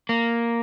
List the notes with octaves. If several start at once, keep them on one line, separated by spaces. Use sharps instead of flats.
A#3